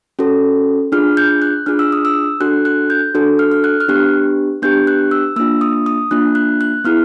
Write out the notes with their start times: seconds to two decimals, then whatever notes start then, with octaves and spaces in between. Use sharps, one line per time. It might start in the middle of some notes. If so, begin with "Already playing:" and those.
0.19 C#4 F#4 A4
0.92 D4 F4 G#4 F6
1.17 G6
1.42 F#6
1.66 D4 F4 G#4 F6
1.79 E6
1.92 D#6
2.05 E6
2.41 D4 F#4 A4 F#6
2.65 F#6
2.90 G6
3.15 D4 F#4 A4
3.39 F6
3.52 F6
3.64 F#6
3.80 F6
3.88 B3 D4 G4 F#6
4.62 B3 D4 G4 G6
4.87 F#6
5.11 E6
5.36 A#3 E6
5.39 D4 F4
5.61 D#6
5.86 D#6
6.11 A#3 D4 F4 F#6
6.35 F#6
6.61 F#6
6.84 B3 E4 G#4 F6